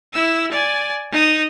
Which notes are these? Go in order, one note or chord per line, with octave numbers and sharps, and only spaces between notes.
E4 E6
D5 G#5
D#4 D#6